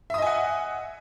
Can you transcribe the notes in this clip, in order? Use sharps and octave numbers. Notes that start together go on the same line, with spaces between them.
D#5 E5 F#5 G#5 D#6